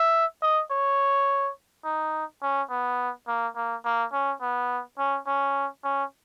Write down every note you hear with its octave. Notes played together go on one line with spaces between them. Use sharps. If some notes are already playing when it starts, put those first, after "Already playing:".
Already playing: E5
D#5
C#5
D#4
C#4
B3
A#3
A#3
A#3
C#4
B3
C#4
C#4
C#4